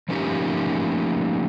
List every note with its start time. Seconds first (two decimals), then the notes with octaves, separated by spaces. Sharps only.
0.09 F3 A3 A#3 C#4 D#4 G4